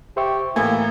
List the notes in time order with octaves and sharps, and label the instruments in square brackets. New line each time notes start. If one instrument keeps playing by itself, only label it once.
[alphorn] G4 [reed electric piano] C5 E5 C#6
[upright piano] A2 E3 A3 [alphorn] A#3 [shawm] E4 [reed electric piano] G#5